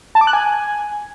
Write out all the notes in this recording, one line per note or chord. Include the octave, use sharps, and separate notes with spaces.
A5
D6
F#6
G#5